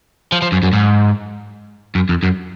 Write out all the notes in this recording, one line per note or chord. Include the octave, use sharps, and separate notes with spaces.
F3
F3
F#2
F#2
G#2
F#2
F2
F#2